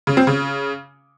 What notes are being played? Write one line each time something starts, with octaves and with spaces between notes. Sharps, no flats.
C#3
C4
C#3